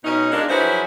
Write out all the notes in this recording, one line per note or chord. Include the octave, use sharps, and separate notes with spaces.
B2 C#4 D#4
G#3 A#3 D4
F3 F#3 E4 G#4 B4 C5